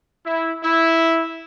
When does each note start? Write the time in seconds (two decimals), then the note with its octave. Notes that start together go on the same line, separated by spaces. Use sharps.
0.25 E4
0.63 E4